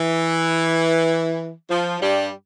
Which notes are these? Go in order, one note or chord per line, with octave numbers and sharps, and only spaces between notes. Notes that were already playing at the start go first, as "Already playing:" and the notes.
Already playing: E3
F3
G2 G3